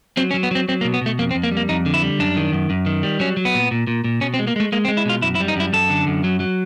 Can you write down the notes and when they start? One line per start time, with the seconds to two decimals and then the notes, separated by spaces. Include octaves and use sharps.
0.17 F#3 C4
0.31 C#4
0.34 F#3
0.43 B3
0.51 F#3 C4
0.68 F#3 C4
0.81 A#3
0.84 B2
0.94 B3
1.01 B2 A3
1.19 F2 A#3
1.31 C4
1.35 F2
1.43 A#3
1.52 G3
1.57 A#3
1.69 F2 D#4
1.86 D3
1.94 E4
2.02 G3
2.19 F#2 D4
2.36 D#3
2.53 F#2
2.70 F#2
2.86 D#3
3.03 G3
3.20 F#3 C#4
3.37 F#3
3.45 B3
3.54 A#2
3.71 A#2
3.87 A#2
4.04 A#2
4.21 B2 C#4
4.34 C4
4.39 G#3
4.47 A#3
4.56 G#3 A3
4.72 G#3 A#3
4.85 C4
4.88 G#3
4.97 E4
5.06 B2 F4
5.22 F#2 E4
5.35 E4
5.40 G3
5.48 D#4
5.56 F#2 E4
5.73 F#2 A4
5.90 D3
6.07 F#2
6.24 F#3
6.40 F#3